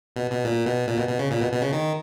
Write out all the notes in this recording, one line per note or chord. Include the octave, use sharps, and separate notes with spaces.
B2
B2
A#2
B2
A#2
B2
B2
C#3
A#2
B2
B2
C#3
D#3